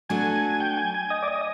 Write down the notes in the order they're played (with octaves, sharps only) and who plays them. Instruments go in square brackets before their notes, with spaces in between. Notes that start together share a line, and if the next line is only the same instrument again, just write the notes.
[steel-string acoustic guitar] F#3 A3 D4 F#4 A4 [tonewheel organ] G#5
[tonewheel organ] G5
G#5
G#5
D#5
D5
D#5